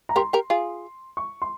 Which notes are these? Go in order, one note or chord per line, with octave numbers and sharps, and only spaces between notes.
A#5
G4 A#4 C6
G4 A#4
F4 G#4
C#6
C6